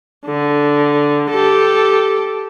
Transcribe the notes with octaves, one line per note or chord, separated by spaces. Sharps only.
D3
G4 A4